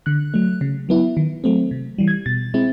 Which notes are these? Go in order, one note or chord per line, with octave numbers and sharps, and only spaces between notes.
D3 F#6
F#3 A3
C#3
F#3 B3 E4
D#3
F#3 A3 C4
C3
E3 G3
G#6
B2 A6
G#3 C4 E4